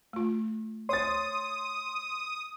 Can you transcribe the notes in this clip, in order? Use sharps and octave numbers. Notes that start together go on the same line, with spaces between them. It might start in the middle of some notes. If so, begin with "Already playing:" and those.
A3 F4
C#5 C6 D#6 A6